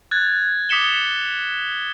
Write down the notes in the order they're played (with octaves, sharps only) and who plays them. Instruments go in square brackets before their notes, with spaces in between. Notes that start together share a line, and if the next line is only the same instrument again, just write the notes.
[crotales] F#6 G#6 A6
D6 D#6 B6 C#7 E7 G7